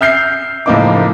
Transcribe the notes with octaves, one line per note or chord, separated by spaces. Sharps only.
E5 F6 G6 C7
F#1 A2 F3 A#3 D#4 D6